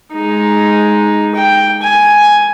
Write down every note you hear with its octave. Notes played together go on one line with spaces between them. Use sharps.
G#3 D#4
G5
G#5